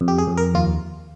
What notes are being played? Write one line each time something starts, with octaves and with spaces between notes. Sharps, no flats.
F2
G4
G#4
F2
A#4
D#2 F4